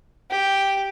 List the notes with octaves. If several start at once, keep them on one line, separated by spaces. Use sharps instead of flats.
G4